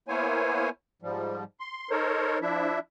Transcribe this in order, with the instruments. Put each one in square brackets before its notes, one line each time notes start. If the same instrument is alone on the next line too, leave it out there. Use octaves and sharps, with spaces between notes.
[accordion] A#3 B3 E4 C5 C#5 G#5
G#2 F3 G3
C6
D#4 A4 A#4 C5 C#5
F3 D4 E4 E5